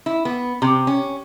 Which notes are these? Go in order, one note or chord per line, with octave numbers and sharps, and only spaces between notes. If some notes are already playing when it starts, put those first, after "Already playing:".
E4
B3
C3
C#4